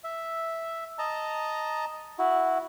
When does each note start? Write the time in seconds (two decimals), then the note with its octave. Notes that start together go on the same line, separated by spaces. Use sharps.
0.04 E5
0.99 D#5 A5 A#5
2.19 E4 F#4